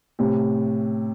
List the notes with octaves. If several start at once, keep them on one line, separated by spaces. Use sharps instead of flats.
A2 C3